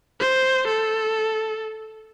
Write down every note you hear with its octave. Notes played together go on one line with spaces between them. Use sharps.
C5
A4